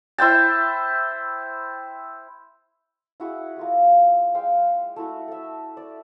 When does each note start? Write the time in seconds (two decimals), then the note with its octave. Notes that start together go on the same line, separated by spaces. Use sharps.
0.18 E4 C5 G5 A5
3.20 E4 F#4 G#4
3.57 A#3 F4 G#4
4.35 G#3 F5 G5
4.96 A3 E4 F#4
5.28 A4 E5
5.77 D5